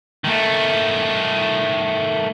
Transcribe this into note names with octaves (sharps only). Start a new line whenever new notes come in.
D#3 A3